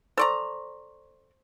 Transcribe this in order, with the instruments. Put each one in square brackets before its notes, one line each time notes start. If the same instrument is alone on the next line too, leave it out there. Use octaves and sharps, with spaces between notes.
[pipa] A4 D5 A#5 [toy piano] C5 C6 C#6